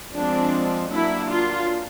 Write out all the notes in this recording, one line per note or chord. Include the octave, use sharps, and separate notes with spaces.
F3 G#3 C4 D4
F#3 A#3 D4 E4
F4